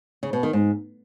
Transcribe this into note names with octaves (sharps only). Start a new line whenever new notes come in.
C#3
B2
D#3
G#2